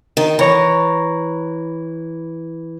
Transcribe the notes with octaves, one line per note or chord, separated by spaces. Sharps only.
D#3
E3 C#5 A#5